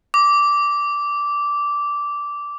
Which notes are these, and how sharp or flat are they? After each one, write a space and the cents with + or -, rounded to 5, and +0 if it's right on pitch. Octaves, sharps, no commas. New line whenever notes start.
D6 -10